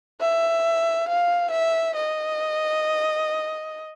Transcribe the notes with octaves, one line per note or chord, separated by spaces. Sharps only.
E5
F5
E5
D#5